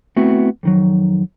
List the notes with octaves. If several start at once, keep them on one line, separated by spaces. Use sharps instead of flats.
A3 B3 C4 E4 F#4
F2 D#3 F#3